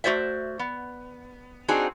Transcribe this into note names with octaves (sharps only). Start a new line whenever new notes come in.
A3 F#4 C5 D5 E5
B3
C4 D4 D#4 F#4 G#4